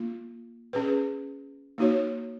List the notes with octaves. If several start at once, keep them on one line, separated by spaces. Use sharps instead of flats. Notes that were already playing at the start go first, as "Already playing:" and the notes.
Already playing: A#3 F4
C#4 G#4 B4
A#3 D#4 F#4 C#5